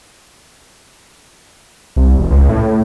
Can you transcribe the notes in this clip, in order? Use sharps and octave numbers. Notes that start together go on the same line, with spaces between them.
C2
E1
C#2
A2